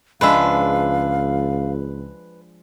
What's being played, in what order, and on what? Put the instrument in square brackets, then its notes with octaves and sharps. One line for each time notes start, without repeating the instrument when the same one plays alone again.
[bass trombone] C#2 [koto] F3 G#3 D4 [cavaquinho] B4 E5 [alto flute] F5